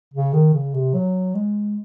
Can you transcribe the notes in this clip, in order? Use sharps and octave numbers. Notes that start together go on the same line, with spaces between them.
C#3
D#3
C#3
C3
F#3
G#3